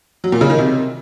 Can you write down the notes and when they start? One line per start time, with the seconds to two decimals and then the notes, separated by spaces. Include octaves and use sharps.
0.24 F#3
0.32 A#2
0.41 C#3
0.50 D#3
0.58 C3